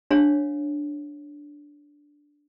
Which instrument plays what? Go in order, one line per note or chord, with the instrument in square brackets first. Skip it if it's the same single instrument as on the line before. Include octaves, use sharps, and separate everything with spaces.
[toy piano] D4 C#5 F5